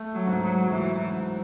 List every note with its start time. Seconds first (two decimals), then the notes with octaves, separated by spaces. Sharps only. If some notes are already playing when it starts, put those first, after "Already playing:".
Already playing: A3
0.13 F#3
0.27 G#2
0.42 F#3
0.70 E3 F#3
1.13 G#2